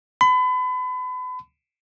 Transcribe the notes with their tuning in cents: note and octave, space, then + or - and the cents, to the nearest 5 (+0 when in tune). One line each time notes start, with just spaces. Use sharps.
B5 +35